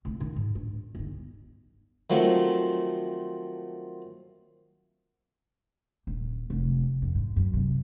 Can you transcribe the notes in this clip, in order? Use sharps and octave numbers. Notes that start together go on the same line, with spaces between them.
C2 A3
D#3 D#4
G#2
G2
G1 D#4
D#3 F3 F#3 A3 C4
D#1
F1
F2
G#2
F#2
C3